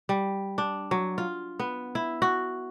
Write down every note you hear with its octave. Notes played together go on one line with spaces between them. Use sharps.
G3
D4
F#3
F4
B3
E4
F#4